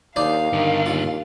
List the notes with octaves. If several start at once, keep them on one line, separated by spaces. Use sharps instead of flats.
D#2 D4 D#4 C5 F5
G2 D3 D#3
D#2 F4